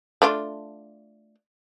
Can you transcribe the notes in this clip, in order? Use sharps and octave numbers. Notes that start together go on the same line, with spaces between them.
A3 D4 F4